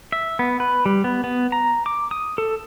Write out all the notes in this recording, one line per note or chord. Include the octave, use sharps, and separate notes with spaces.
E5
B3
B4
G3
B3
B3
A#5
D6
D#6
A4